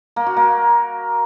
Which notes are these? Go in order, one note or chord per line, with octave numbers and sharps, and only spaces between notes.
A#3
F#4
A#3